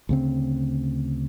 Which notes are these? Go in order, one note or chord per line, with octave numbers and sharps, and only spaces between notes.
D2 C#3 C4